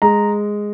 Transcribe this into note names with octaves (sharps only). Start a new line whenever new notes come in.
G#3 A#5